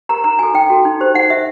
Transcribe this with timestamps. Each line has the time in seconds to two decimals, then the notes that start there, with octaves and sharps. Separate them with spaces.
0.09 G4 A#4 A#5
0.24 D#4 A#5
0.39 F#4 A4 G#5
0.54 D#4 G5
0.70 F#4 A4
0.85 D#4
1.00 G4 C5
1.14 D#4 F#5
1.30 G4 C5 E5